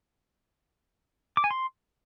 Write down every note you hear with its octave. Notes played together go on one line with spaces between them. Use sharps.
D6
G#5
C6